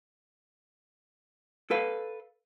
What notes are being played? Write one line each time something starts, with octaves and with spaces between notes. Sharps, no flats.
A4 B4 F5